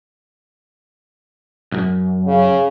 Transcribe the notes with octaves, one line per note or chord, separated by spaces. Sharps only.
C2 F#2
C#3